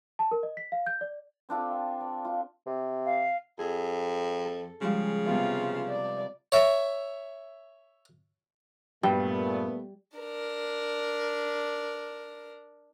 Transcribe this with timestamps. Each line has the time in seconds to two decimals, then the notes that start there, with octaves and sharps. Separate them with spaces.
0.19 A5
0.31 A#4
0.43 D#5
0.57 B6
0.72 F5
0.86 G6
1.01 D5
1.49 C4 D4 F4 A4
1.71 F5
2.00 D5
2.25 F4
2.67 C3
3.05 F5
3.59 F2 G#4
4.45 A4
4.81 C#3 F3 G3 G#3
5.27 C3 G3 B3 F4
5.89 D5
6.52 C#5 E5
9.03 G2 A#2 G3 A3 B3 G5
10.17 D4 A#4